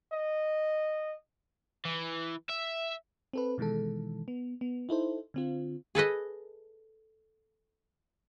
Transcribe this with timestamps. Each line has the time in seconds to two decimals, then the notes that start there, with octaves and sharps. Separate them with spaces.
0.12 D#5
1.85 E3
2.49 E5
3.33 C4 A4 B4
3.58 B2 D#3 E3 G#3 A4
4.28 B3
4.61 B3
4.89 D#4 E4 A4 C5
5.34 D3 C4 F4
5.95 G#4 A4 B4 D#5